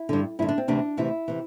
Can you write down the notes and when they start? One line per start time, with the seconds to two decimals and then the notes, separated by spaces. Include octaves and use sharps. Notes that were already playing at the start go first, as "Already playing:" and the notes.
Already playing: E4
0.09 G2 D3
0.39 G2 D3 E4
0.48 D4
0.58 C4
0.68 D2 C3 E3 D4
0.97 D2 C3 E3 E4
1.28 C3 E3